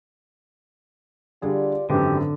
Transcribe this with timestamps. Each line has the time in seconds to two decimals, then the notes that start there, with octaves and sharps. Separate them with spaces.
1.42 D3 G3 F4 G4 G#4 D5
1.90 G#1 F#2 D3 E3 G4 B4